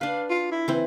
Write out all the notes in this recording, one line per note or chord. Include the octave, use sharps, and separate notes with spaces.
D4 B4 F5
F4
E4
E3 C4